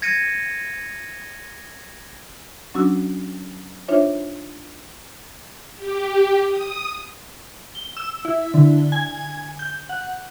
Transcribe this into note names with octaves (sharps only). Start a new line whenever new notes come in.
G#6 A#6 C#7 D#7
F#3 C#4 D4 F#4 D#6 E6
D4 D#4 F4 C5 C#5 E5
G4
D#6
G7
E6
E4
D3
G#5
G6
F#5